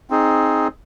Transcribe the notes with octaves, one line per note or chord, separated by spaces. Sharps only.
C4 D#4 G#4